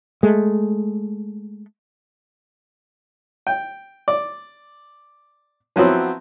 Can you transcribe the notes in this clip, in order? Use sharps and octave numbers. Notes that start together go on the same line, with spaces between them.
G#3 A3
G5
D5
F3 F#3 B3 C4 E4